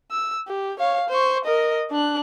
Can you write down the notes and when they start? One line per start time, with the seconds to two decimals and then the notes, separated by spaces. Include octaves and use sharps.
0.11 E6
0.47 G4
0.79 C#5 F5
1.09 C5 C#6
1.44 A#4 D#5
1.91 D4 F#6